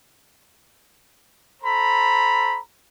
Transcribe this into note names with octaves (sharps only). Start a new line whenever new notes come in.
A4 C5 A#5 B5